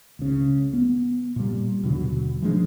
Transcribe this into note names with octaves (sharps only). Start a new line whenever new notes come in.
C#2 C#3
B3
A#2 G3
D#2 B2 D3 F#3
E3 F3 G#3 D4